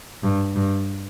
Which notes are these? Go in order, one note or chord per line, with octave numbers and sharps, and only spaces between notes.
G2
G2